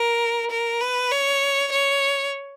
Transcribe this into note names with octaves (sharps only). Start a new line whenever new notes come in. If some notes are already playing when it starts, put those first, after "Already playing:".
Already playing: A#4
A#4
B4
C#5
C#5